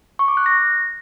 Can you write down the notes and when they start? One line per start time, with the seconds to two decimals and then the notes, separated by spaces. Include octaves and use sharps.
0.19 C#6
0.28 D6
0.37 F#6
0.46 A#6